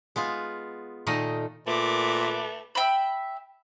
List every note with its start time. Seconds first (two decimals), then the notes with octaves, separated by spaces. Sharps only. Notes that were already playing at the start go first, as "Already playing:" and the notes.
0.16 G#3 B3 F4
1.07 A#2 D#3 A3 D#4 D#5
1.67 A#2 A3 B4 D6
2.75 E5 G5 B5